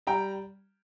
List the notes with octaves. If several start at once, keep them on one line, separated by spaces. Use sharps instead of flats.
G3 G5 A#5